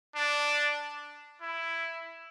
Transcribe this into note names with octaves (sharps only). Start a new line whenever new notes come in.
D4
E4